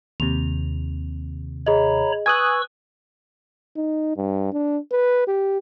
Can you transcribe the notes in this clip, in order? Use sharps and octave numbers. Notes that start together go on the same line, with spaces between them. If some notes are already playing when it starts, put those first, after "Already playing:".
D#2 C3 F7
G#4 C#5 D#5 A#5 B5
B4 G#5 C#6 D#6 E6 F#6 G#6
D#4
G2
D4
B4
G4